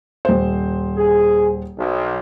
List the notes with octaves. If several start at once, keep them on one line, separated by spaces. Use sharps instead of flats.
D#1 C5
G#4
B1